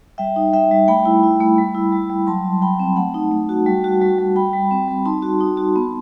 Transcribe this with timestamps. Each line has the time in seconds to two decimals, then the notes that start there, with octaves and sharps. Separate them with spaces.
0.18 G3 E5 G5
0.36 D#4
0.53 G3 E5 G5
0.71 G3
0.88 A3 G5 B5
1.05 E4
1.23 E4
1.40 A3
1.58 G3
1.75 E4
1.92 G3
2.10 G3
2.27 F#3 A5 C6
2.44 F#3
2.62 F#3 G5 B5
2.80 C4
2.96 A3 F#5 A5
3.14 D#4
3.31 A3
3.49 F#4
3.66 G3
3.84 F#4
4.01 G3
4.19 G3
4.36 G3 G5 B5
4.53 G3
4.71 C4
4.88 G3
5.05 D#4 A5 C6
5.22 F#4
5.41 D#4
5.57 F#4
5.76 B3